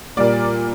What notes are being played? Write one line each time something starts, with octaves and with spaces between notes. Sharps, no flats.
A#2 G3 A#3 D5